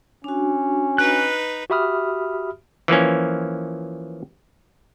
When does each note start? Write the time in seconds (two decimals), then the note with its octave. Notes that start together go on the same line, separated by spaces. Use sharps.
0.24 C#4 D4 F#4
0.98 D#4 B4 F#6
1.70 F#4 G4 E5 B5 D#6 F6
2.88 E3 F3 A#3 C#4